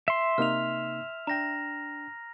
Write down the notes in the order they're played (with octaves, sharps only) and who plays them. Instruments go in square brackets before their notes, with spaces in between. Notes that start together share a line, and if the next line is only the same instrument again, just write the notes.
[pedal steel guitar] E5 C6
[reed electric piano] C3 A#3 D#4 [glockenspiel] F6 F7
[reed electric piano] D4 G5 [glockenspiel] A#5 A#6